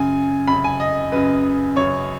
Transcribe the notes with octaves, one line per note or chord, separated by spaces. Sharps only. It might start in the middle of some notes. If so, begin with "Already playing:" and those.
Already playing: F#2 C#3 G#5
F#2 C#3 B5
G#5
D#5
F#2 C#3 B4
F#2 C#3 C#5